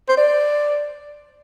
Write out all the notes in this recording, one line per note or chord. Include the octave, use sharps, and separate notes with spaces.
C5
D5